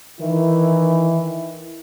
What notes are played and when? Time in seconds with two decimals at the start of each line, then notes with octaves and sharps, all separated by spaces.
0.21 D#3 E3 D#4 E4